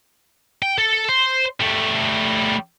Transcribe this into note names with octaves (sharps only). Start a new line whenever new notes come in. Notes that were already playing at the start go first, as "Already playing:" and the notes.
G5
A4
C5
G3 A3